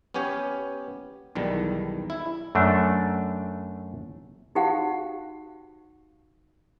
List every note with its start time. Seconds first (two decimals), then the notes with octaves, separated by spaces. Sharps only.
0.14 B3 C#4 G4 C#5
1.35 B1 E2 D#3 G3
2.10 E4
2.55 F#2 A3 D4
4.55 D#4 F#4 G4 C5 F5 F#5